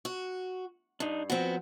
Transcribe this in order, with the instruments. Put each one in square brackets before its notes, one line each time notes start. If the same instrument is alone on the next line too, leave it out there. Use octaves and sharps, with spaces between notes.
[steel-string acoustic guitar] F#4
[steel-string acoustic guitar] G2 [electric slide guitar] D4 D#4
[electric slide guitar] F3 F#4 [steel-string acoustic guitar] B3 C4